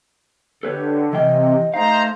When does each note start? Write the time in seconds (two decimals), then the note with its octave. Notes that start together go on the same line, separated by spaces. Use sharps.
0.63 D3 G4 A4 B4 C#5
1.13 C3 E3 D#5 G5
1.74 A3 D#4 C5 F5 A#5